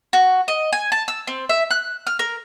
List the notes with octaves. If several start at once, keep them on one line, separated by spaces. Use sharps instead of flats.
F#4
D#5
G#5
A5
E6
C4
E5
F#6
F6
A#4